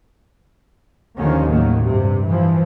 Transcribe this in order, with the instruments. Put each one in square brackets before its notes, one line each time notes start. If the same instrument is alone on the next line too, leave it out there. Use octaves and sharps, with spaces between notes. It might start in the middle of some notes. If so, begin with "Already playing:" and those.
[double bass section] D#2 D3 D#3 F3 C#4
A2 D#3 F#3 A#3
G2 C3
E3 F3